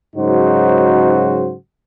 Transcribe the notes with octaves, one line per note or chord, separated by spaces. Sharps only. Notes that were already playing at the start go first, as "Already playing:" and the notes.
G#2 C#3 F#3 D#4 F#4 C5